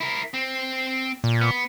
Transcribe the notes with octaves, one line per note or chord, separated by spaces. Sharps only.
E4 A#4
C4
A#2
B3